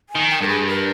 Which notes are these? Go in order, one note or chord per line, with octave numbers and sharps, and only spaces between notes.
G#5
D#3
G5
G2 A#4
G#4
A#4